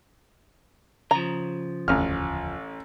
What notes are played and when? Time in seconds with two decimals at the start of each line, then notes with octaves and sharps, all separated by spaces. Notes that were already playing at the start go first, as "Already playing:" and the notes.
1.11 C#3 F3 A#5
1.88 E1 A1 D2 F6